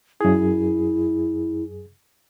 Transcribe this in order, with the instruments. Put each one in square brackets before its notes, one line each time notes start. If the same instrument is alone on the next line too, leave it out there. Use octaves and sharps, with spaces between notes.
[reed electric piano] F#2 G#4 [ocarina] E4